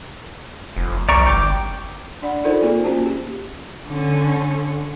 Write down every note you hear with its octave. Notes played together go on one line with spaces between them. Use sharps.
F1
C2 D5 A#5 C#6
G1 G5 D6
D4 D5 F#5 B5
D#4 F4 A4 A#4 C5 D5
A#3 C4 F4 G#4
A#3 C#4 F4 F#4 C5 A5
G4
D3 C#4